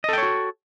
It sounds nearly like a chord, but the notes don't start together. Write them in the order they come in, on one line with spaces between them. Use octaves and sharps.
D#5 A4 G5 C#5 F#4